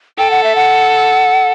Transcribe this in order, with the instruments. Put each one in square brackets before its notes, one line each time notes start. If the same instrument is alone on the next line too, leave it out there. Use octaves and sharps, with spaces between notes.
[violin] A4 [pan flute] G5
[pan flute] F#5
E5
F#5